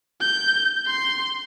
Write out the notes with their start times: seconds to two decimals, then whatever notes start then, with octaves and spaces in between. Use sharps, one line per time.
0.21 G6
0.87 C6